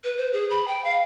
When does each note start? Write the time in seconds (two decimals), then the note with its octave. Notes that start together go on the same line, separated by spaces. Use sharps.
0.04 B4
0.17 C5
0.33 G#4
0.50 B5
0.68 G5
0.84 F5